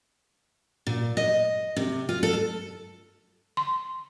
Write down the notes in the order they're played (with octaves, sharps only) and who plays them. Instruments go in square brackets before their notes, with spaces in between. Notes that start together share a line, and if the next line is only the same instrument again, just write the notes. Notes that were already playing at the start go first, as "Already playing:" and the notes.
[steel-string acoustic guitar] A#2
D#5
C3
F4
A4
[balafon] C6